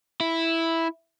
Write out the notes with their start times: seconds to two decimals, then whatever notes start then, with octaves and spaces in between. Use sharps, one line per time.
0.20 E4